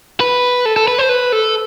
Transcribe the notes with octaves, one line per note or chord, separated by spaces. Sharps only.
B4
A4
A4
B4
C5
B4
A4